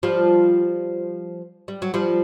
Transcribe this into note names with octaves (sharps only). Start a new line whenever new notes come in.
F3 G3
G3
F#3
F3 G3